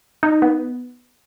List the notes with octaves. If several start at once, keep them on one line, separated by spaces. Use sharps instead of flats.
D#4
B3